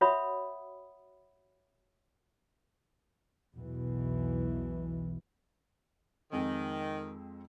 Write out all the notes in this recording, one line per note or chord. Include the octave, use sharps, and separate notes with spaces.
F#4 C#5 E5 F#5 B5 D#6
B1 E2 B2 E3
F2 D#3 G#3 C4